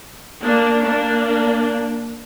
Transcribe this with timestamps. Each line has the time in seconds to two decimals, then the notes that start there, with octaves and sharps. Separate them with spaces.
0.42 A#3 D4
0.83 A#3 D4